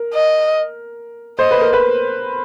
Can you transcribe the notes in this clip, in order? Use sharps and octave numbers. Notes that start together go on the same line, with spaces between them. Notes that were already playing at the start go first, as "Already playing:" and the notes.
Already playing: A#4
D#5
C5 D#5
B4
A#4
B4